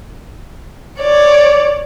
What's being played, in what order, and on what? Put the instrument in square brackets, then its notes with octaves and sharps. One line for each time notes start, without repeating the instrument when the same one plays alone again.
[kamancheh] C#5 D5